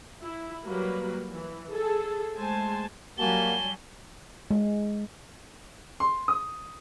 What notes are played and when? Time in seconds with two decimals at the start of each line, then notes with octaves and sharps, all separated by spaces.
0.23 E4
0.66 F#3 G3 A#3 F#4 B4
1.35 E3
1.73 G#4 A4
2.37 G#3 A3 C5 G#5 A5 C6
3.18 F#3 G3 A#3 F#4 G#5 A5 G7
4.51 G#3
6.00 C6
6.28 D#6